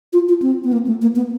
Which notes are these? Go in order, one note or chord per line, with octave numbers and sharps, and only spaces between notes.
F4
F4
C4
B3
A#3
A3
A#3
B3